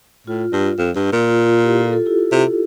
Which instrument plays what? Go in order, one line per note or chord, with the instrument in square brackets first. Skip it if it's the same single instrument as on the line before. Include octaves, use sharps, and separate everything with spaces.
[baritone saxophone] A2 [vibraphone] F4
[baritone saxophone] G2
F2
G2
A#2
[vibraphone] F4
F4
E4 G4
F4 A4
F4 A4
E4 G4
F4
[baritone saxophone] C3 [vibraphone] E4